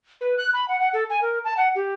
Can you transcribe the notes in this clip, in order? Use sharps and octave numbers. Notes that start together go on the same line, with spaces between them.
B4
F#6
B5
F#5
F#5
A4
G#5
A#4
A5
F#5
G4